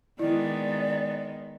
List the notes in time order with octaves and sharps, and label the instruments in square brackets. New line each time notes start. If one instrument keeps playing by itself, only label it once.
[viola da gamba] D#3 G#3 B3 [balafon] E4 [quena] D5